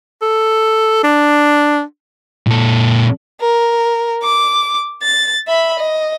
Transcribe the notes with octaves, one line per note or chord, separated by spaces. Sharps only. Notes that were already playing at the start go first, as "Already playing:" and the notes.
A4
D4
A#2 A4
A#4
D6
A6
E5 B5
D#5